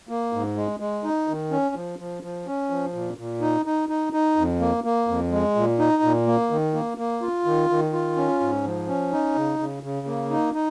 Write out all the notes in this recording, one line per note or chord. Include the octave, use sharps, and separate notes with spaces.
A#3
G#2
G#3
G#3
D#4
D#3
C#4
F3
F3
F3
C#4
F3
A#2
A#2
D#4
D#4
D#4
D#4
F2
A#3
A#3
F2
G#3
A#2
D#4
A#2
A#3
D#3
A#3
A#3
F4
D#3
D#3
F4
C#4
G#2
F3
C#4
D#4
C#3
C#3
C#3
A#3
D#4
D#4